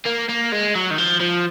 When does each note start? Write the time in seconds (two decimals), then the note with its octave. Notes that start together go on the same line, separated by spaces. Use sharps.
0.05 A#3
0.29 A#3
0.52 G#3
0.75 F#3
0.91 D#3
0.98 F3
1.21 F3